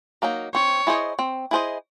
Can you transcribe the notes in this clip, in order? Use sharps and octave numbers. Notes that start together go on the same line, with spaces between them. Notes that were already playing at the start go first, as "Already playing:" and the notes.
F#3 A#3 D#4
C4 C#5
E4 G#4 C5 D#5
C4
E4 G#4 C5 D#5